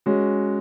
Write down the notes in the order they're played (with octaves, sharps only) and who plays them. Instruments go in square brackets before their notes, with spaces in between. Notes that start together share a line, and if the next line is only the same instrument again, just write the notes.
[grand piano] G#3 C#4 F#4